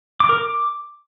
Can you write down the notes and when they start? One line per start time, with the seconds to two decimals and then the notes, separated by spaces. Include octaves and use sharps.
0.20 D6
0.29 A#4
0.38 D6